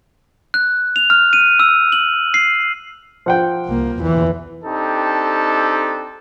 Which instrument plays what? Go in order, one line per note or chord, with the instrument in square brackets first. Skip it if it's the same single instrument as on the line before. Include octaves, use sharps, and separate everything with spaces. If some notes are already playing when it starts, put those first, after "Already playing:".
[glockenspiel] F#6
F7
F6
D#7
E6
F#7
C7
[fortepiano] F3 F#5 G5
[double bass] C2 A#3
E2 E3
[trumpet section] C4 D4 D#4 G4 A4